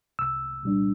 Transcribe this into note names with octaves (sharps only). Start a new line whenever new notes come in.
C2 E6
A#2 G3 D4